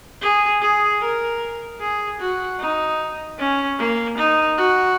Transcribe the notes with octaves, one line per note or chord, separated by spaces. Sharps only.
G#4
G#4
A#4
G#4
F#4
D#4
C#4
A#3
D#4
F#4